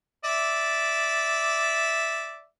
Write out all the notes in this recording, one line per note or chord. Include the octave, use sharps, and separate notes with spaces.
D5 E5